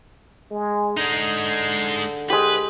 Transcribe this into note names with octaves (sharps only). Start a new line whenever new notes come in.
G#3
D3 G#3 D#4
G#3 G4 B4